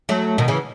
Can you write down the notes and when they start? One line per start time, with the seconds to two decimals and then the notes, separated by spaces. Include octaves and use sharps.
0.09 F#3 A3
0.38 B2 D#3
0.48 C#3 E3